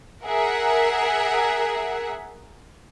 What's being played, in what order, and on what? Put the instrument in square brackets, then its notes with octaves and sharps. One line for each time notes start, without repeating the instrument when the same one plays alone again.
[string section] G#4 A#4 E5 F#5